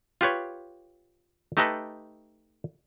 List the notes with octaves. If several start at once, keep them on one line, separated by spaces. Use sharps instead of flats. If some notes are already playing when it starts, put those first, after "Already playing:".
F4 G4 B4 C#5
A3 D#4 G4 A4 B4 D#5